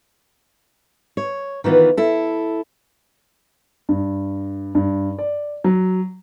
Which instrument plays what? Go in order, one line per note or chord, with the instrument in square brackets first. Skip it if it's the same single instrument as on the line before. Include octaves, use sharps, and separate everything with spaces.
[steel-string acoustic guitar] C#5
D#3 E3 B3 F4
E4 A4
[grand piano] G2
G2
D5
F#3